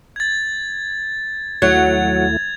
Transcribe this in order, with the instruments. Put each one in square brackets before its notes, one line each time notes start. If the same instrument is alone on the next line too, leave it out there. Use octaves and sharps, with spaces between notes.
[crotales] G#6 A6
[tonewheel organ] D#2 A3 E4 [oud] F#3 [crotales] G#6 F7